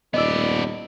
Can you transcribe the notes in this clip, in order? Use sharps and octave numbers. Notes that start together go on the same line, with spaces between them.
D#1 B3 D5 D#5 E6